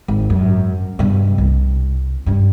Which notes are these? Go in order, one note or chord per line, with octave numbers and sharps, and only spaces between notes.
G#1
F#2
G2 B2
C2
G2 C#4